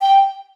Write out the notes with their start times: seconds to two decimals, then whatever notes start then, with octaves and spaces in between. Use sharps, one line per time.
0.01 G5